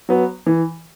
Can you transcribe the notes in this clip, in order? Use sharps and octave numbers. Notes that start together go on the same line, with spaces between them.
F#3 B3
E3